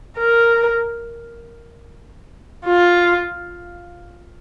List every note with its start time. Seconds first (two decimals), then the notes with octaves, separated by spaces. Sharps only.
0.18 A#4
2.65 F4